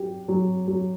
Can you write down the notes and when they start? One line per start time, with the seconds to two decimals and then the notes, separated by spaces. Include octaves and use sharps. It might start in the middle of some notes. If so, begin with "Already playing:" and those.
Already playing: F#3 G4
0.28 F#3
0.68 F#3